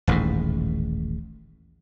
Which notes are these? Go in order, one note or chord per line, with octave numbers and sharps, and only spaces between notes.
D#1 A1 D#2 G#2